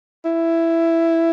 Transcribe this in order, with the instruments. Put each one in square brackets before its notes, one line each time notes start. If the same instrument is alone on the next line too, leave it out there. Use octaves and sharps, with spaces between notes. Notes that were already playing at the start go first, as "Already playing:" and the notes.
[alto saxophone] E4